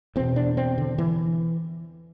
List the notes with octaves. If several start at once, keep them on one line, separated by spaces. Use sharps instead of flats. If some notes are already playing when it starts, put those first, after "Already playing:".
E2 B2 C4
D4
C4
D3
E3